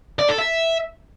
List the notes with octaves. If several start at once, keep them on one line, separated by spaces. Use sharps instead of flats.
D5
A4
E5